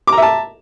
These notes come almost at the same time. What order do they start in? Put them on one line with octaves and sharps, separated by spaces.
D6 A#5 E5 A5